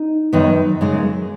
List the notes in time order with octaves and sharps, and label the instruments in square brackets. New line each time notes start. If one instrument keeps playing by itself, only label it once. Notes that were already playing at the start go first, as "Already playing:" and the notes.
Already playing: [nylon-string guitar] D#4
F#2 D#3 B3
F#2 C#3 G#3